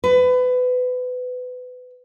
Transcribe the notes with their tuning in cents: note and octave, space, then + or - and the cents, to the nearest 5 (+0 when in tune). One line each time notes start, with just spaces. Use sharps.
B4 +25